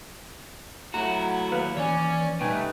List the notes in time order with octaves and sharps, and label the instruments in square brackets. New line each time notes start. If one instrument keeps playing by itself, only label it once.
[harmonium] F#3 [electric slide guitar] A3 A#5 [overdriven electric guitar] E4 F#4
[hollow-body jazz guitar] D#2 B4 F5
[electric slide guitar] E3 [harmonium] C#4 D5 [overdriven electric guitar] C#5 G#5
[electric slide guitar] B2 G3 [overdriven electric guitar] A3 [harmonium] D#4 B4 [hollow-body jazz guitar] G5 G#5